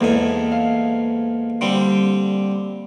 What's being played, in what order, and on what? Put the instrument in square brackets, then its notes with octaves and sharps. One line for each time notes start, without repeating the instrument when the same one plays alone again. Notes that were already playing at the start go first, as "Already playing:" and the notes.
[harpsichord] E2 G#2 G#5 [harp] A#3 A4 D#5
[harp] F5
[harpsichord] D3 G3 C4